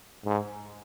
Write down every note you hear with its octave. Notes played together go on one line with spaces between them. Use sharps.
G#2